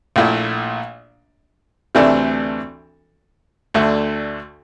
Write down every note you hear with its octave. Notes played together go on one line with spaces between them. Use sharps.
A#1 A#2 A3 E4
D2 C3 E3 A3 D4
D2 D3 A3